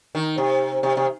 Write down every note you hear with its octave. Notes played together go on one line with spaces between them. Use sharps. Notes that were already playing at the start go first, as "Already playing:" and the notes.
D#3
C3
C3
C3